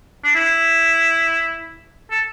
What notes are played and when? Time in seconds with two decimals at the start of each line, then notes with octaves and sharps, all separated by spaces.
0.24 D4
0.36 E4
2.11 A4